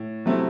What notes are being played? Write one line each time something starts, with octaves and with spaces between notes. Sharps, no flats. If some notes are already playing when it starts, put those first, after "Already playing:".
Already playing: A2
C3 F#3 A3 C4 E4